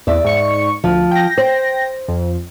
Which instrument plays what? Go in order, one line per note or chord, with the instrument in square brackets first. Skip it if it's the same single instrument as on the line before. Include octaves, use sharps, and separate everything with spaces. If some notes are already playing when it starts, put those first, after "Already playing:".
[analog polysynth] E2 [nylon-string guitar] D5 E5
[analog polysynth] G#2 C#6 C#7
[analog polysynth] D2 [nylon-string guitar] F3
[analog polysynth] G5 A#6
[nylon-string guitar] C5
[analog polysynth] F2